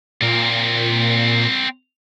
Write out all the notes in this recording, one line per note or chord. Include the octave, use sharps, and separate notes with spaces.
A#2 C4 A#4